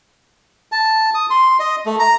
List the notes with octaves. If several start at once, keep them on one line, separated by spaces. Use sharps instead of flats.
A5
D#6
C6
D#5
A3
A#5